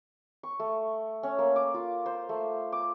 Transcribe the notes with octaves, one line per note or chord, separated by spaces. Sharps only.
C#6
A3
C#4
A#3
D6
F4
C5
A3
D6